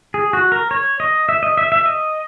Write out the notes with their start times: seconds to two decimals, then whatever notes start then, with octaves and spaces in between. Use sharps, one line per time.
0.14 G#4
0.33 F#4
0.52 A#4
0.71 C#5
1.00 D#5
1.29 E5
1.43 D#5
1.57 E5
1.72 E5
1.86 D#5